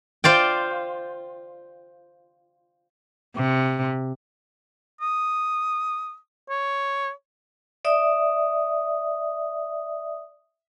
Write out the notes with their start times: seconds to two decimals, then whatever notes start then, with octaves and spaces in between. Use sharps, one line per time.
0.24 F4 C5 D5 G5
3.36 C3
5.01 D#6
6.50 C#5
7.85 D5 E5 D#6